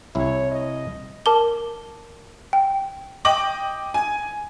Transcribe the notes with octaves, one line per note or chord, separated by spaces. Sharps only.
C2 E4 C#5
D#5
A#4 A5 D6 G7
G5
D#5 G5 D6 F#7
G#5